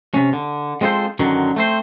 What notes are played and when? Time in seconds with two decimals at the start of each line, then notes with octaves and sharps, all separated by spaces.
0.14 C3 C#4
0.33 D3
0.81 G#3 C4 F4 A4 C5
1.19 F#2 D3 D#3 F#3
1.56 A3 C4 C5